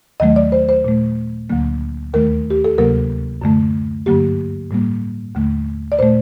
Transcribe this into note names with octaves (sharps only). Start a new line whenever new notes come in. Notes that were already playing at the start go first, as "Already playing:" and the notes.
D#2 D#3 F#3 A3 D#5
D5
C5
C5
A#2 A3
D2 D3 F#3 A#3
D#2 D#3 A3 A#4
G4
A4
D2 C3 F#3 A#3 A#4
F#2 D3 A3
G2 D3 F#3 A#3 G4
A2 G3 A#3
D#2 D3 A3
D5
A#2 A3 C5